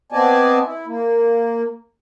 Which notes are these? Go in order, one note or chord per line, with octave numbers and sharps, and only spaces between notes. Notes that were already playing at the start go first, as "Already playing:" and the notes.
B3 C4 D5 D#5 G#5 A5
E4
A#3